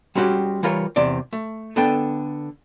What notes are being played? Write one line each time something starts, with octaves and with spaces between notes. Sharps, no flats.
G3 G#3 C#4 F#4 G4
E3 G3 F4 A#4 C#5
E2 C3 D5
A3
D3 B3 A4 G5